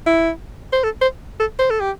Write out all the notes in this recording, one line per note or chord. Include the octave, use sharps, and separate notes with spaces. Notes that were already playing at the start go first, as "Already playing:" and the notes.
E4
C5
A4
C5
A4
C5
A4
G4